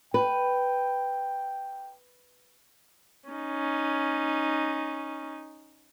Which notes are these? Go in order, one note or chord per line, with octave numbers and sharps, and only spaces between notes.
B4 G5
C#4 D#4